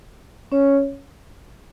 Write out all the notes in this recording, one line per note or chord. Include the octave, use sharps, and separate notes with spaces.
C#4 C#5